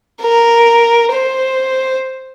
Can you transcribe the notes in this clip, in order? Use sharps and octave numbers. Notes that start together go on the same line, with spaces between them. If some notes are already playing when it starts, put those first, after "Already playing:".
A#4
C5